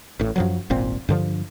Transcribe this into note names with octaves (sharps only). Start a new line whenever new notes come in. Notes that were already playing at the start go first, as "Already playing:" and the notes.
A1 A2
F#2 F3 F#3
D#1 G#1 A#2 C4
G2 D3 F3